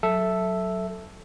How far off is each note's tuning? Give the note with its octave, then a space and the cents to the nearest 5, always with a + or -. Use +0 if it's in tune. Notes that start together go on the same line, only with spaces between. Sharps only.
F#3 +10 A4 +0 E5 +0